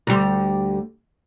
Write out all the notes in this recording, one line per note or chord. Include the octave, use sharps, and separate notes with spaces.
D2 G3